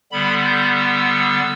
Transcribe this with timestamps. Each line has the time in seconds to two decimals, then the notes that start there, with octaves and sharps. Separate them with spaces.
0.12 D3 G3 B3 B5
0.45 G6
0.77 E6